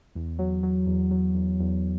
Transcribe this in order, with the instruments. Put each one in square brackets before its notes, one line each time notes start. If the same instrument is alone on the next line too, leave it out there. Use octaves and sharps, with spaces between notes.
[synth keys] E2
F#3
F#3
E2
F#3
E2
E2